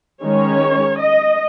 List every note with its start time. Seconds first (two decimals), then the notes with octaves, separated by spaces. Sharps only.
0.21 D#3 G#3 C#4 C#5
0.99 D#5